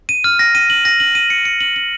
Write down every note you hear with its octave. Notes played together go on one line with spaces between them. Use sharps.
D#7
F6
A#6
D#7
F#7
A#6
F#7
D#7
C#7
C#7
F#7
F#7